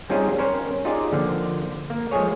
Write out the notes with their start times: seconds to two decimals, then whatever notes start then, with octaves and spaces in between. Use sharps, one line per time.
0.10 G3 C4 C#4 D#4 F4 G#4
0.38 C#4 A#4 C5 C#5
0.85 D#4 F4 G4 G#4 D5
1.12 D3 F3 A#3
1.90 A#3
2.11 F3 G#3 A3 G#4 C#5